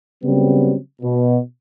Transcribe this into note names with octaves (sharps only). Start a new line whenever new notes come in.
C#3 F#3 G3 B3 C4
B2